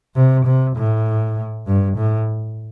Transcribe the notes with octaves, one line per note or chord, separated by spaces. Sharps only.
C3
C3
A2
G2
A2